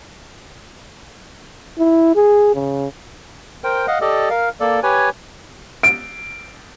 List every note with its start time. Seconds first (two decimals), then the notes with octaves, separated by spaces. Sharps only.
1.79 E4
2.16 G#4
2.55 C#3
3.64 A#4 C5 G5
3.88 D#5 F5 F#5
4.01 G4 A4 D5 D#5
4.30 A#4 F5
4.60 A#3 A4 D5
4.83 G4 B4 C#5 G#5
5.83 D7